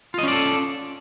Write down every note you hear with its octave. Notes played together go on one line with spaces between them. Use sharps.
C#4 F4 A4 D5 D#5